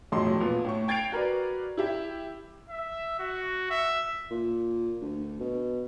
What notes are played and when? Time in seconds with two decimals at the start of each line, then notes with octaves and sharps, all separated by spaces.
0.12 E1 F2 A2 F#3 D#5 C6
0.40 A#2 A#3 B3
0.65 A2 C#6
0.88 G5 G#6 A6 C7 D7 F7
1.12 F#4 A#4 B4 D5
1.77 E4 G4 E5
2.70 E5
3.19 F#4
3.70 E5
4.30 A#2
5.01 D2
5.40 B2